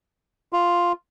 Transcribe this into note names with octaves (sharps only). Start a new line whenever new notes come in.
F4